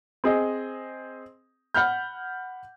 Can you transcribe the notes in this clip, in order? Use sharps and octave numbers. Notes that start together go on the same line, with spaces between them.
C4 G#4 D#5
F#5 B5 F6 G6